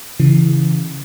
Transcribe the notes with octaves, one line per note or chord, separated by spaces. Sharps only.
C#3 E3